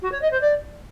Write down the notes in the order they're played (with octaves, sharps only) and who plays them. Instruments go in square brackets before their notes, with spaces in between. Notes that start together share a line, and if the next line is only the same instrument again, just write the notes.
[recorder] F#4
C#5
D#5
C5
D5